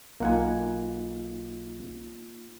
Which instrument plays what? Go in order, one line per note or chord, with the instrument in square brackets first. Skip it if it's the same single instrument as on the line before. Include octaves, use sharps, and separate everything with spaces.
[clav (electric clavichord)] B1 F#5 G#5 [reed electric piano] A#3 D#4 F4